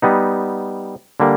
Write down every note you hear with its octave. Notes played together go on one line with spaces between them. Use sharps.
G3 B3 D#4
D3 G3 A#3